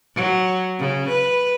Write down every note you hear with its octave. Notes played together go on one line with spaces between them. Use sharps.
F#3
C#3
B4